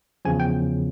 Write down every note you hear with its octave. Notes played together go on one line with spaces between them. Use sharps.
E2 C#3 F3 G#5
G5